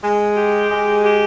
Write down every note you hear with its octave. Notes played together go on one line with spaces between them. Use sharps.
G#3
G4
G#3
G4